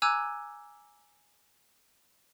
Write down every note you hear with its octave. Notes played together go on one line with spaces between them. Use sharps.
G#5 A#5 D6 E6 F#6 G#6